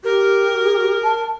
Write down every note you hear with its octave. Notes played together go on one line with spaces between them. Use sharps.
G4 A#4
A5